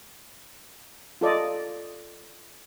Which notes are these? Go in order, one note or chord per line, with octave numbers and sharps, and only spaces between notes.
F4 A4 D5 D#5